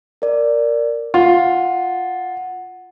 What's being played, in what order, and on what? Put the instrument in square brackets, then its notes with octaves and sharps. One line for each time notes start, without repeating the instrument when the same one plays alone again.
[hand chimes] A#4 D5
[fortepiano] F4 [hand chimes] F#5